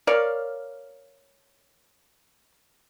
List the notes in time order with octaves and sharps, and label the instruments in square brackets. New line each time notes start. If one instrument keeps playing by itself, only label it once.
[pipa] A#4 C#5 D5 F5